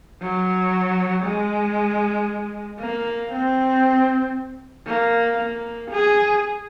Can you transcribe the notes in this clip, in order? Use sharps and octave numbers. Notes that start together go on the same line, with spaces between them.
F#3
G#3
A#3
C4
A#3
A#3
G#4